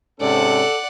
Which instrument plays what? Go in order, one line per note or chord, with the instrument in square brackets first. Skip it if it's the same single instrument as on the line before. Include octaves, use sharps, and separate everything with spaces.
[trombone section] G#2 C3 C#4 [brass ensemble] A4 [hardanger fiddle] D5 F#5